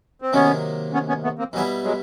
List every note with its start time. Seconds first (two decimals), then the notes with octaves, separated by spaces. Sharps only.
0.22 C4
0.33 C3 D#3 F#3 A#3 B3 C#4
0.93 B3 C#4
1.08 B3 C#4
1.24 A3 B3
1.39 A#3 C4
1.53 B2 E3 F#3 G3 B3 E4
1.84 F#3 G#3